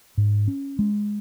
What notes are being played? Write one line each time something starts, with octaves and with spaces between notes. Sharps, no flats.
G#2
C#4
G#3